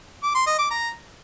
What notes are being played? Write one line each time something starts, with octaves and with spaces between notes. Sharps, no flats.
D6
C6
D#5
D6
A#5